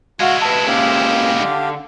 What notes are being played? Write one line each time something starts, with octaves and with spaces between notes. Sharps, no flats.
G#3 E4 F#4 F5
B4 A5 E6
A#2 C#3 G4 F5
D3